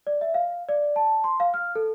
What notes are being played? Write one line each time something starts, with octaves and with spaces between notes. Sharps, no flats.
D5
E5
F5
D5
A5
C6
F5
F6
A4